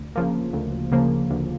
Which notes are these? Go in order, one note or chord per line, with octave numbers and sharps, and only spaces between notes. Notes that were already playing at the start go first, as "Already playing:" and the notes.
Already playing: D2
C#3 F3 A#3
D2
C#3 F3 A#3
D2